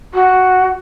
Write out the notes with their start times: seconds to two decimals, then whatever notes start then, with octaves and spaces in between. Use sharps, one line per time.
0.14 F#4